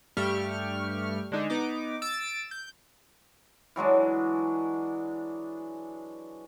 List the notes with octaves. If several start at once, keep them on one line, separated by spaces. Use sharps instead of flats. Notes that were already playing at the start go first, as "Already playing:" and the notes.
G2 G3 A3 G4 C#6 F6
D3 G#3 D4 D#4
B3 D#4 D6
E6 A6 D7
G6
E3 F#3 G#3 D4